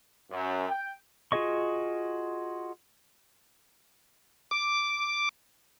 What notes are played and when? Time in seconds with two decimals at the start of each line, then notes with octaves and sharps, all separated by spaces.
0.30 F#2
0.68 G5
1.32 F4 F#4 G#4 D#5 C#6
4.51 D6